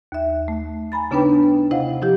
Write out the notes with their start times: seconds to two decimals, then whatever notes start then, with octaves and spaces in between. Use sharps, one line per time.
0.12 D#2 E5
0.48 A3
0.92 G#5 A#5 B5 A6
1.11 C#3 B3 D4 D#4 B4 G5
1.71 C3 E4 C5 D#5 F5 F#5
2.02 F3 E4 G4